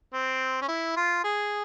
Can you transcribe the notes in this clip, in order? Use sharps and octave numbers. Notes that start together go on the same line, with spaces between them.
C4
C#4
E4
F4
G#4